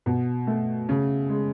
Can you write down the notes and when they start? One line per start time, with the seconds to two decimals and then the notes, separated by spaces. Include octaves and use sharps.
0.06 B2
0.47 A3
0.89 C#3
1.29 G#3